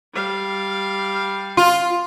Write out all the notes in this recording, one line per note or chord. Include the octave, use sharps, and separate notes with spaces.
G3 F5
F4